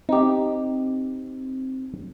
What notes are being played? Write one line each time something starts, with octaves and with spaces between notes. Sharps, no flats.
C4 D#4 G4